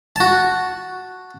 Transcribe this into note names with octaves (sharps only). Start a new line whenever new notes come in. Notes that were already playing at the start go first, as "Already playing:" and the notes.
F#4 A5